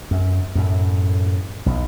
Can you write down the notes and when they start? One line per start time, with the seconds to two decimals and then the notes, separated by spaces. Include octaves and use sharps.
0.11 F#2
0.55 F#2 A2
1.66 B1